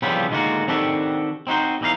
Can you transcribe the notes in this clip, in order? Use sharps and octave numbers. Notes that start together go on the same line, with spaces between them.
C#3 E3 F3 G3 B3 C4
D2 D#3 G#3 A#3 F4 F#4
D#3 C4 D4 F#4 G4 A4
C4 D#4 F#4 C5
E2 E3 D#4 A#4 F5